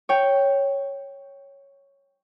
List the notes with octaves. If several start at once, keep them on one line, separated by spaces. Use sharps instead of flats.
C#5 G5